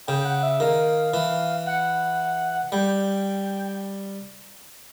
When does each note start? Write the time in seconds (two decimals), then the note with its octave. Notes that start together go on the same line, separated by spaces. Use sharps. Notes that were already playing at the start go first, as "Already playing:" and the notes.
0.07 C#3 G5
0.25 F#5
0.43 E5
0.60 D#3 F5
1.14 E3
1.66 F#5
2.72 G3 G5